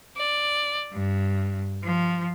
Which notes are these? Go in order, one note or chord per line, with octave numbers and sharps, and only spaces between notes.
D5
G2
F3